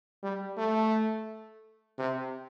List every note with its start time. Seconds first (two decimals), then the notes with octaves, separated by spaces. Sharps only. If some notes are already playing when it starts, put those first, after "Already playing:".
0.23 G3
0.58 A3
1.98 C3